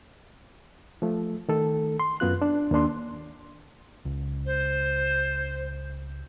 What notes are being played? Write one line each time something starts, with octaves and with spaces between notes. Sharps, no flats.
F3 A3
D#3 A3 A4
C6
F#2 B3 F4 F#6
D4
D#2 A#3 D4 C6
C#2
C5